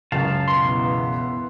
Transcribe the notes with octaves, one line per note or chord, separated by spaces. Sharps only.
C#2 F#2 F5 A5
B2 E3 B3 C6